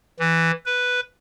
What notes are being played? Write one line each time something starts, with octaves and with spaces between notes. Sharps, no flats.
E3
B4